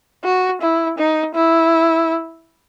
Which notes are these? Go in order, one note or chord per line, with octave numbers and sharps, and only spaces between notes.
F#4
E4
D#4
E4